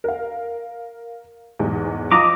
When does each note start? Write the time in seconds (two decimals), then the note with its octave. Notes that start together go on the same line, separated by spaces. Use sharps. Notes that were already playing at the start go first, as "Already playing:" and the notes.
0.04 A#4 F5
1.59 B1 E2 G#2
2.12 F3 F4 D#5 A#5 D6